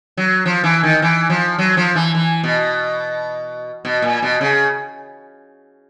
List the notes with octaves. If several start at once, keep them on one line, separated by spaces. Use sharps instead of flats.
F#3
F3
E3
D#3
E3
F3
F#3
F3
E3
E3
B2
B2
A#2
B2
C#3